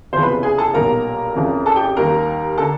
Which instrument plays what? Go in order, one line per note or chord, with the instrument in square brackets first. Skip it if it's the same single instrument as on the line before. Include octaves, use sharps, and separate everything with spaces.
[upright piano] F#1 E2 C3 F3 C5 C6
B4 B5
G#4 G#5
A4 A5
B1 A#2 G3 A#3 A#4 A#5
F#1 F2 C#3 F3
A4 A5
G4 G5
D#2 D#3 G3 A#4 A#5
D3 A4 A5